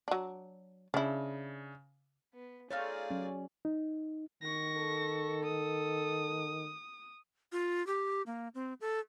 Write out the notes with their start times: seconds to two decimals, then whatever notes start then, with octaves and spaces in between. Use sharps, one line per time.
0.08 F#3 D4
0.94 C#3 D4 E4
2.34 B3
2.71 A3 D#4 F4 G#4 C#5 D5
3.11 F#3 C#4
3.65 D#4
4.43 D#3 C#6 A#6
4.77 A4
5.44 D#6
7.52 F4
7.87 G4
8.26 A#3
8.55 C4
8.81 A4